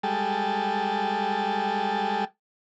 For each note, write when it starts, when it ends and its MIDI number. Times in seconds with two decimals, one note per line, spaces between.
0.03 2.25 55
0.03 2.25 56
0.03 2.25 69